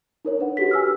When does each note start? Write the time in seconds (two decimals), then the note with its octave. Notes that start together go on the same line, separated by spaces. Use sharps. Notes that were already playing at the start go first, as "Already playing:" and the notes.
0.25 D#4 A#4 C#5
0.39 D4 B4 F#5
0.57 F#4 G4 A4 B6
0.71 G#5 E6 F6